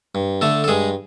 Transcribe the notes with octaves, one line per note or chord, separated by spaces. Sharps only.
G2
D3 A3 A4
A4
G2 G#3 G#4